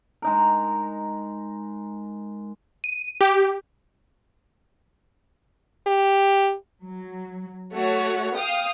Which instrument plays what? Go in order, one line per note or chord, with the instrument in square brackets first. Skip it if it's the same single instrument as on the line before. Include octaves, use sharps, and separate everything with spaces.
[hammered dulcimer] G#3 D#4 A#4
[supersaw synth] D#7
G4
[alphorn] G4
[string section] F#3
A3 F#4 C#5
F5 G5 D#6